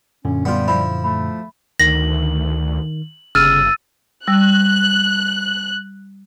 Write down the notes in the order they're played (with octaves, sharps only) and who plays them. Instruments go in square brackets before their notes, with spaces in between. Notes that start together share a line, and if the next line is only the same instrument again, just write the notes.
[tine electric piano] F#2 A#2 D3 [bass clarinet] C#4
[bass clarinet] G3 [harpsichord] B3 F4
[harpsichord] F3 E4 [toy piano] B5
[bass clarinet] A3 [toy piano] B5
[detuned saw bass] D2 [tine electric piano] D#3 [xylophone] A#6 [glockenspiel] F#7
[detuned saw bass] G1 [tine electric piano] C#3 [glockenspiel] E6 A6 D#7 [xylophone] F6
[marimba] G3 E6 [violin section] F#6